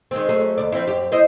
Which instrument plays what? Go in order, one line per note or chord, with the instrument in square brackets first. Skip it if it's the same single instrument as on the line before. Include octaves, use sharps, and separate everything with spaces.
[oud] D#3 G#3 C4
F#3 A3 G#4
D2 D5
F3 C4 E4
F#2 G4
E4 C5 D#5